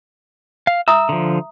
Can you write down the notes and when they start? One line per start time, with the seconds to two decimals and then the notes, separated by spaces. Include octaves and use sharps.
0.67 F5
0.88 E5 A#5 D#6 E6
1.09 D3 F3